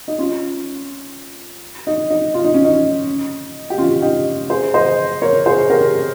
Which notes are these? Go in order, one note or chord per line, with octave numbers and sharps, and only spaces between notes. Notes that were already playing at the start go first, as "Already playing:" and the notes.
D#4
C#4 F4
D#4
D#4
F4
D#4
C#4
D#4
G4
C#4 F4
D#4 G4
G#4 C5
C5 D#5
A#4 C#5
G#4 C5
G4 A#4